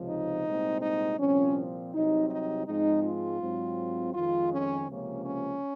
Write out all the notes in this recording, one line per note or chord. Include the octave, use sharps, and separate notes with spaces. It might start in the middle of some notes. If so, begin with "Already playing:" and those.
Already playing: C#2 C3 F3
D#4
C2 A#2 G#3 C4
D#4
C2 A#2 F3 C4 C#4
C2 C3 F#3 C4 D#4
D#4
G#2 F3 G#3 C4 D#4
F4
G#2 F#3 C4
F2 D#3 G#3 F4
C#4
C#2 C3 F3 A#3 C#4
C#4